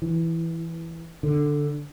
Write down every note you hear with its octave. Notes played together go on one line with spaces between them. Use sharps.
E3
D3